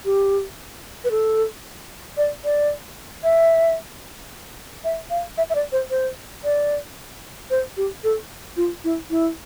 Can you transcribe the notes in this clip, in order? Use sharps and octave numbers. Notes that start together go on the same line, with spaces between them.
G4
B4
A4
D5
D5
E5
E5
F5
E5
E5
D5
C5
C5
D5
C5
G4
A4
F4
E4
E4